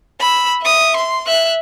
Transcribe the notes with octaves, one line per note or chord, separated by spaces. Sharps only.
B5 E6
E5 D#6
C6
E5 F#6